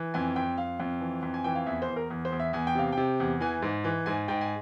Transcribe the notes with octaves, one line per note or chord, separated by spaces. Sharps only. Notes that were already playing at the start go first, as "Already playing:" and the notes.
Already playing: E3
F2 G#5
F2 G5
F2 F5
F2
E3
F2
G#5
E3 G5
F5
E2 E5
C5
E2
A#4
E2
C5
E2
E5
E2 G#5
G5
C3 F5
C3 G5
E2
E3 G#5
G#2
E3
G#2 G#5
G#2 G5
G#5